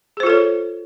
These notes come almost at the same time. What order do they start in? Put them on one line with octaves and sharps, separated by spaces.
G#4 C5 F4 A4 C#5